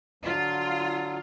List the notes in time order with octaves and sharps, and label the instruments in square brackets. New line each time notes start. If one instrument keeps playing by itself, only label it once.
[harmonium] D3 F#3 [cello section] F4